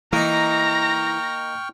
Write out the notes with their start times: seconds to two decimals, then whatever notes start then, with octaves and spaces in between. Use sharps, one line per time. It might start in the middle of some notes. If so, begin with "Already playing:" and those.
0.13 E3 A#3 D#4 G5 A#5 C#6 F6 A#6